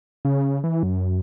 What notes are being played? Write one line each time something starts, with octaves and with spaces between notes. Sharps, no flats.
C#3
E3
F#2